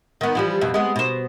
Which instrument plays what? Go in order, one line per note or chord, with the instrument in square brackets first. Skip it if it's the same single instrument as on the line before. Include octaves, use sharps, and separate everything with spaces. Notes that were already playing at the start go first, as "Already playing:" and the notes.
[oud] D#3 B3
E3 F3 G3
F2 B2
G#3 B3
B2 C5